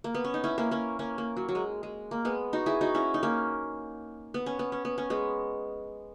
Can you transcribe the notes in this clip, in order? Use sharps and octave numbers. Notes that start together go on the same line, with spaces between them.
A#3
B3
C#4
D#4
C#4 E4
A#3 C#4
A#3 C#4
A#3 C#4
A#3
F#3
F#3
G#3
G#3
A#3
G#3 B3
D#4 F#4
E4 G#4
D#4 F#4
C#4 E4
D#4
A#3 C#4
B3
C#4
B3
C#4
B3
C#4
G#3 B3